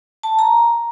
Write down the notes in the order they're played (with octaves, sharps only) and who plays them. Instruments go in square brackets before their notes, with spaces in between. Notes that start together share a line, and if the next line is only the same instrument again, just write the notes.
[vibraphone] A5
A#5